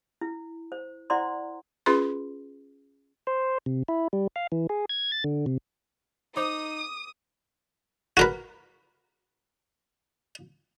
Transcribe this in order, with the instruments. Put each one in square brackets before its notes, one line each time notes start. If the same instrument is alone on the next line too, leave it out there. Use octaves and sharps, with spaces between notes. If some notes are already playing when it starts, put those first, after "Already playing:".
[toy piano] E4
C5
E4 C5 D5 F#5 A#5 C6
[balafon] C#4 F4 G#4 B4 B5 C6
[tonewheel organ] C5
C3
E4
G3
F5
E3
G#4
G#6
A6
D3
C3
[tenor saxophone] D#4 [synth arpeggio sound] C5 A#5 [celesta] D6 [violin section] D#6
[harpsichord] F#4 A#4 B4